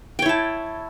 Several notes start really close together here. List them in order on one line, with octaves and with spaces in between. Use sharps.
G5 C#5 E4 A5